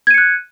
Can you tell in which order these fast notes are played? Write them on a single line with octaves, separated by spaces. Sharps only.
G#6 D#7 C#7 F#6